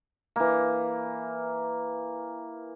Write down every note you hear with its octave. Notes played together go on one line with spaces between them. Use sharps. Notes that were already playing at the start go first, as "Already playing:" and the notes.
E3 A#3